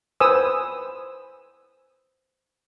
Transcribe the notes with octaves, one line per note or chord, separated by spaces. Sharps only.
B4 C5 G#5 D#6 E6